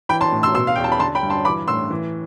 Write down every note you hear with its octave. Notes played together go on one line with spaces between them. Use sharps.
E3 G5 B5
A5 C6
A2
C6 E6
B2 C6 E6
F5
E2 G5
A5
B5
D3 A5 C6
G5 B5
G2
A5 C6
E3 B5 D6
A2 C6 E6
E3